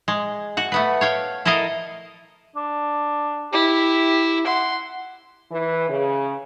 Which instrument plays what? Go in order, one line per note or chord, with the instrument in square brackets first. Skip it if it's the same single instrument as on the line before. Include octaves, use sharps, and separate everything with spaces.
[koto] G#3
F#4 F#5
A3 B3 B4
C#5 F5 G5
E4 A4 A#4 D#5 F5
[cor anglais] D4
[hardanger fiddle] E4 [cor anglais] G4
[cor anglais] F#5 [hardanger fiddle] C6
[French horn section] E3
C#3